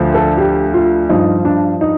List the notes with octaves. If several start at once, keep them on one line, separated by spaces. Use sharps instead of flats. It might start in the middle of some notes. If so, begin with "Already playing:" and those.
Already playing: D2 D3 F3
A4
G4
F4
G2 F3 D#4
D4
D#4